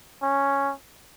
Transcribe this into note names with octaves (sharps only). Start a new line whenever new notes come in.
C#4